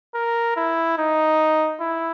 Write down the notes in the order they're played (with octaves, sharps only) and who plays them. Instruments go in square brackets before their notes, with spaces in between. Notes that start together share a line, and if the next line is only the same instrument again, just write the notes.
[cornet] A#4
E4
D#4
E4